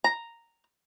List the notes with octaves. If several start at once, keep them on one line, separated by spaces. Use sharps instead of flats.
A#5